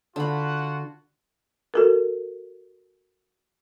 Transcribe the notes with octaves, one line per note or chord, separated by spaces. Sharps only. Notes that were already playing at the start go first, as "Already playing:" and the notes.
D3 F4 F#4 F#5 B5
F#4 A4 A#4